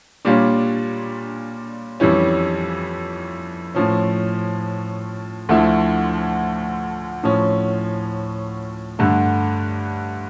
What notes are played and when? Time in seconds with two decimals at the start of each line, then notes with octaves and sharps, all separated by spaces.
0.25 A#2 G3 D4 F4 C#5
2.00 F2 E3 G3 C#4
3.75 A2 F3 C#4
5.49 D2 D3 F3 A3 E4
7.23 A2 F3 C#4
8.99 G2 D3 A3